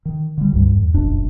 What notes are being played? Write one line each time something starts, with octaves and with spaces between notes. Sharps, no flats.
D#3
D3 G3
C#2 G2 G3
E2
F1 A#1 F#2 D4